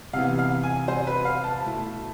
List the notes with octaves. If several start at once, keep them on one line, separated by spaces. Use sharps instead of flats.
C3 E3 B3 F5
F5
G#5
C5
B4
F5
A5
B2 A3 E4